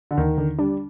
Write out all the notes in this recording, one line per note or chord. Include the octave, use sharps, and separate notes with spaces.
D3
D#2 D#3
D3
G3 D4